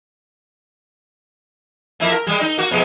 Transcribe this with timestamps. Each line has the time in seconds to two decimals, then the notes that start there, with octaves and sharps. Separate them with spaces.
2.00 F2 A#3 E4
2.12 A#4
2.27 G3 G#3
2.41 D#4
2.58 A#3 F#4
2.71 F2 B2 G#3